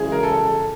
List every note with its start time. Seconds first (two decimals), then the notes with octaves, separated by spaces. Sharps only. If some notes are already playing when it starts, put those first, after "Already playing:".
Already playing: F#2 C#3 E3 G#3 G#4
0.12 A#4
0.23 A4